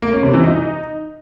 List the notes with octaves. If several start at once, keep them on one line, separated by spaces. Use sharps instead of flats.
A#3
C#4
C3
E3
D#4